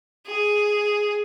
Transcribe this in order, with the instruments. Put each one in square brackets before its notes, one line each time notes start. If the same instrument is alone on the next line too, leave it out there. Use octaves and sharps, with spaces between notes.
[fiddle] G#4